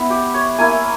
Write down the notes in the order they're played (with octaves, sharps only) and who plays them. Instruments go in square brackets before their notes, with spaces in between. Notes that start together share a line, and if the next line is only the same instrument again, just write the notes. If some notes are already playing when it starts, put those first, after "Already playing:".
Already playing: [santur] B3 E4 B4
G4
C#5
A#3 E4 G#5